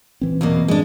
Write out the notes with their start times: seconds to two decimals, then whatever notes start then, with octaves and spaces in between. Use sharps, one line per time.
0.21 A#2 E3 C4
0.41 E2 B2 A#3
0.68 G#3 D4